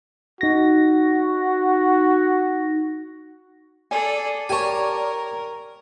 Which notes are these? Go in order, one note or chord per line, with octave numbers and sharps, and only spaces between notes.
D#4 F#4 A#6
G#4 A4 D5 G#5
G4 A#4 C#5 G#5 A5